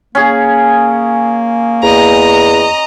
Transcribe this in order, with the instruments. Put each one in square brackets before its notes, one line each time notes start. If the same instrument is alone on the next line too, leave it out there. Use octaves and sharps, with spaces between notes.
[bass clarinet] A#3 [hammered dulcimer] C#4 G#4
[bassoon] E2 [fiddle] D#5 A#5